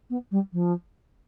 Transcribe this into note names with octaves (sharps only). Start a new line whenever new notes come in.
B3
G3
F3